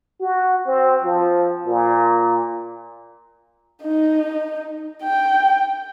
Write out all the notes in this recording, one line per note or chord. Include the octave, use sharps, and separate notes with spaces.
F#4
C4
F3
A#2
D#4
G5